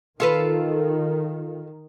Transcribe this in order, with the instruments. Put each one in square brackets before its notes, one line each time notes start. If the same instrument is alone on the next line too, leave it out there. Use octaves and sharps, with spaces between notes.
[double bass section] D#3 [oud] F4 A4 B4